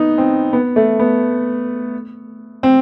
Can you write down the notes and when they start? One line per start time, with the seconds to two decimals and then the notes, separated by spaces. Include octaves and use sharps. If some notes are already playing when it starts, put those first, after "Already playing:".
Already playing: B3 D#4
0.18 C4
0.53 B3
0.76 A3
1.00 B3
2.63 C4